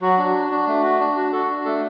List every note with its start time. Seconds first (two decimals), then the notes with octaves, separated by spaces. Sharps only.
0.01 F#3 F#4
0.18 D4
0.34 F#4
0.51 D4
0.67 A3
0.83 F#4
1.00 D4
1.17 F#4
1.33 F#4 A4
1.50 D4
1.65 A3 A4